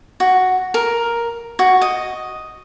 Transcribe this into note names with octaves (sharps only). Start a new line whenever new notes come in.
F#4
A#4
F#4
D#5